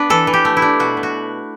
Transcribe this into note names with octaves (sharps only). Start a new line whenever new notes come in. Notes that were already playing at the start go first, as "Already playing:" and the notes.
Already playing: B3 D4 B4
E3 A4
E3
G4
A3
E4
D4
B2 F#4
B2
F#4